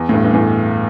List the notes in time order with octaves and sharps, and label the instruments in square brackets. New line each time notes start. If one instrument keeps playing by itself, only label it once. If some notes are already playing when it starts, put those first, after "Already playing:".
Already playing: [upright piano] E2
A2
G2
G2
E2 A2